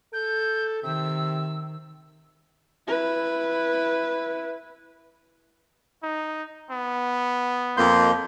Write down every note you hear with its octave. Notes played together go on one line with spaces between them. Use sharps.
A4 G6
C3 D#3 E6
E4 B4
D#4
B3
F2 A#3 C6 G6